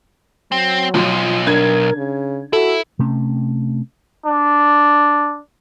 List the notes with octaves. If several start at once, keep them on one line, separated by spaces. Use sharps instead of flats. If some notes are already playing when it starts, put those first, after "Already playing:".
F#3 C4
B1 F3 C6
D4 A#4 G#6
C#3
E4 F#4 A4
C3 A3 C#4
D4